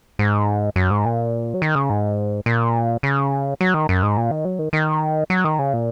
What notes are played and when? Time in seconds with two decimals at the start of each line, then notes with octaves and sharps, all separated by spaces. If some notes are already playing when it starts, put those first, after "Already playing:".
0.19 G#2
0.76 F#2
0.91 G#2
1.05 A#2
1.54 F#3
1.62 D#3
1.75 C#3
1.90 G#2
2.46 A#2
3.03 C#3
3.61 F#3
3.74 D#3
3.89 F#2
4.03 G#2
4.17 A#2
4.31 D#3
4.45 F#3
4.59 D#3
4.73 D#3
5.30 F#3
5.44 D#3
5.59 C#3
5.73 A#2